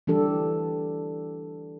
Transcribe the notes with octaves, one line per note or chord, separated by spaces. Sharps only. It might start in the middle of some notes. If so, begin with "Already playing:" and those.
E3 G3 D4 G4 A4